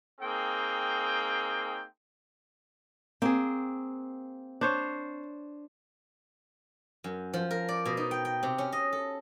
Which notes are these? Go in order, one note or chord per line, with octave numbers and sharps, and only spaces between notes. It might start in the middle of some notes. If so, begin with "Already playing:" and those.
A#3 C4 D#4 G#4 G5
A#3 C4 G#4
D4 C5 C#5
F#2
F3
A#4
D5
B2
D#4
G5
G5
C3
C#4
D#5
A4